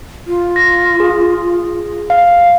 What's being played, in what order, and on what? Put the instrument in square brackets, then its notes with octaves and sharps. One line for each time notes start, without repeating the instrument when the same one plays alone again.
[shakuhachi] F4
[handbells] A#6
G#4
F5